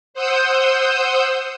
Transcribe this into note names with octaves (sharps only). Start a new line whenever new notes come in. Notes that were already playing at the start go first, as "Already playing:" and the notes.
C5 F#5 D#6 E6 G6